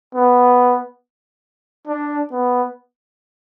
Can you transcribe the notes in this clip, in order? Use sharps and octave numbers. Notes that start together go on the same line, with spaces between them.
B3
D4
B3